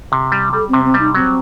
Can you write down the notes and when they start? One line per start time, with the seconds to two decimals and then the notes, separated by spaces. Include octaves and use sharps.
0.12 C3
0.32 G3
0.53 G3 A4
0.68 C4
0.73 C3
0.84 C4
0.94 G3 D#4
1.14 F#3 C4